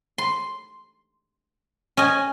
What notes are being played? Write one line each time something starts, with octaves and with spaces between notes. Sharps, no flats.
C6
C#4 D#5 G#5